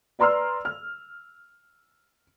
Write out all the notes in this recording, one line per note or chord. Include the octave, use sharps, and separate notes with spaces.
B4 D5 A#5 C6 E6 F6
F6